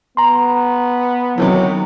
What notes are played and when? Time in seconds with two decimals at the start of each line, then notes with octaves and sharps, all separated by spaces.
0.17 B3 A#5 C6
1.38 C3 D#3 E3 F#3